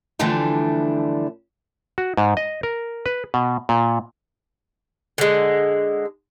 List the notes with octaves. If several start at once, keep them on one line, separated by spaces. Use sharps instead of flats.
D3 E3 F3 G3 A3 D4
F#4
G#2
D#5
A#4
B4
B2
A#2
D3 G#3